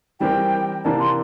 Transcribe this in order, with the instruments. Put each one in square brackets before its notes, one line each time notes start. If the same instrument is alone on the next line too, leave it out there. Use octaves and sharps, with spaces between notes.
[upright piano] E3 G3 C4 G4 A#4 [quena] G5
[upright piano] C3 E3 A#3 D4 [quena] A5
[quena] C6